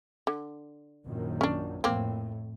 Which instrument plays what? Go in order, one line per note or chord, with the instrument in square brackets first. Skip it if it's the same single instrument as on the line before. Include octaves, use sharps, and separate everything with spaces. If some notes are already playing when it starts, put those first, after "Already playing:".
[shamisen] D3
[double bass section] A#1 F#2 D#3
[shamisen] C#4 D4
[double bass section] F2 A2 [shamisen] A#3 C4